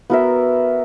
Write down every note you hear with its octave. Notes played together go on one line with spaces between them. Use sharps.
B3 F#4 A#4 E5